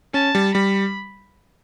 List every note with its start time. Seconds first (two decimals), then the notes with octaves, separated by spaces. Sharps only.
0.14 C#4 A5
0.35 G3
0.55 G3 B5